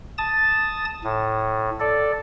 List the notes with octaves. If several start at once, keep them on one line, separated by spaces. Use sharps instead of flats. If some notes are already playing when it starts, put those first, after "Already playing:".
A5 D#6 A6
A2
A4 D5